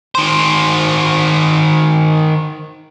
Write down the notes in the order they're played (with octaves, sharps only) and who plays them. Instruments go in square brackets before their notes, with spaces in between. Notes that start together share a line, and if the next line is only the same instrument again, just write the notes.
[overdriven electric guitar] D#3 C5